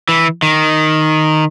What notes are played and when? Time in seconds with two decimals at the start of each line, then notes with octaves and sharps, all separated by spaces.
0.09 E3
0.42 D#3